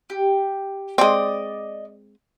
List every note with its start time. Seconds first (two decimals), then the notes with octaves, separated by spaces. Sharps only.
0.10 G4
0.98 G#3 C4 D5 D#5